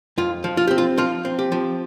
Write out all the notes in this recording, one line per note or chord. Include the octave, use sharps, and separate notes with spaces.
F2 F4
F3
F4
C4 G4
F4
F3 F4
C4
G4
F3